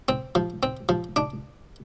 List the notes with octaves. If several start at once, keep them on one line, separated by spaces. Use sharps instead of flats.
C4
F3
C4
F3
D4